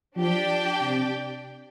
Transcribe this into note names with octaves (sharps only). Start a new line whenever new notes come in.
F3 D4 G4 D5 G5
C3